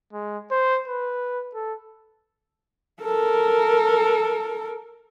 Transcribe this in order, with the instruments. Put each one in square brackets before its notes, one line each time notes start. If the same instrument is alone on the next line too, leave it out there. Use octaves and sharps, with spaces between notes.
[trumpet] G#3
C5
B4
A4
[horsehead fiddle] A4 A#4